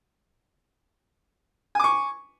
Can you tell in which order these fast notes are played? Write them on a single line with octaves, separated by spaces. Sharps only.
G#5 D6 C#6